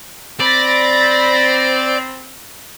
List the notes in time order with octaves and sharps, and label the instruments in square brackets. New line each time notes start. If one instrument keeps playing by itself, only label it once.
[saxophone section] C4 [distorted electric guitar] D5 [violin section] B5 A6 A#6